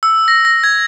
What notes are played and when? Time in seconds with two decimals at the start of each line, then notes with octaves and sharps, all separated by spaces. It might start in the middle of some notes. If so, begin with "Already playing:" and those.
0.03 E6
0.28 A#6
0.45 A#6
0.64 G#6